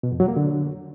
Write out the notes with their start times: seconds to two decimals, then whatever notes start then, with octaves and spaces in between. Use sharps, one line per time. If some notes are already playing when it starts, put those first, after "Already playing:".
0.03 B2
0.12 F2
0.20 F#3
0.28 A#3
0.36 D3